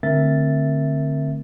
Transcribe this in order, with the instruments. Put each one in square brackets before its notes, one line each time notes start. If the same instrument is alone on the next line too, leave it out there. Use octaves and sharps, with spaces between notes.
[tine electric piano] D3 A3 C4 A#4 E5 A6